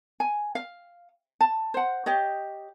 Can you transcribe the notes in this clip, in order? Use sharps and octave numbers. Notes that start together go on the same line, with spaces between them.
G#5
F5
A5
C5 F#5
G4 C#5 D#5